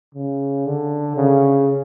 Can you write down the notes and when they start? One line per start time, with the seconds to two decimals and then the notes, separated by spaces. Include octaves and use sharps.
0.15 C#3
0.66 D3
1.17 C#3